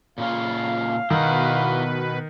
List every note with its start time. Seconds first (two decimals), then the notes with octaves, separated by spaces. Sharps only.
0.18 A#2 C#3 F4 F5
1.10 B2 D#3 E4 B4 F#5